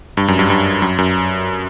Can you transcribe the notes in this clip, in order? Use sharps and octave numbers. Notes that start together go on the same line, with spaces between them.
G2
F#2
G2
G2
F#2
F#2